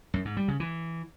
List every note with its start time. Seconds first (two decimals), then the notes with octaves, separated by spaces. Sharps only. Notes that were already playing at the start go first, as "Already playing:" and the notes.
0.14 F#2
0.25 G#2
0.37 G3
0.48 C#3
0.60 E3